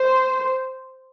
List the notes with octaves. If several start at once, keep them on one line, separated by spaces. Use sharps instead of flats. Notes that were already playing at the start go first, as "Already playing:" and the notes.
Already playing: C5